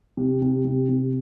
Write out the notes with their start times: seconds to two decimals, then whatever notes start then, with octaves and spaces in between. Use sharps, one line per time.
0.17 C3
0.42 C3
0.65 C3
0.89 C3